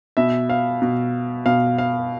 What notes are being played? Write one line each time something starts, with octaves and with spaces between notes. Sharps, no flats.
B2 E5
F5
B2
B2 F5
F5